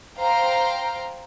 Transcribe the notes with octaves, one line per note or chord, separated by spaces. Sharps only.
C5 F5 G5 A#5